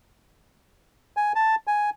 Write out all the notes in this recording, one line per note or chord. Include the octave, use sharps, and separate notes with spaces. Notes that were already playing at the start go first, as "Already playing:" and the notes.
G#5
A5
G#5